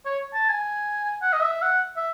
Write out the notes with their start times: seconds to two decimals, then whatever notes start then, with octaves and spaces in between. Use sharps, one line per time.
0.05 C#5
0.34 A5
0.49 G#5
1.22 F#5
1.33 D#5
1.42 E5
1.62 F#5
1.97 E5